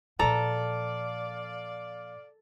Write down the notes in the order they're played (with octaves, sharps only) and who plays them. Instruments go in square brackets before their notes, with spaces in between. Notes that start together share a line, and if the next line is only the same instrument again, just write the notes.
[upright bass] A#2 F3 [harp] A4 [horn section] D5 F5 [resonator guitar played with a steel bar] A#5